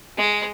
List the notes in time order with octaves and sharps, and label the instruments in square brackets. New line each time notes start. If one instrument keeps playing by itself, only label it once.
[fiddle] G#3